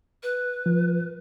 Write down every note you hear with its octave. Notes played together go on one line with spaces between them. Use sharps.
B4
F3